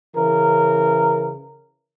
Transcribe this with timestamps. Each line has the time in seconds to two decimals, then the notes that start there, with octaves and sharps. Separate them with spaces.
0.16 C#3 E3 A#4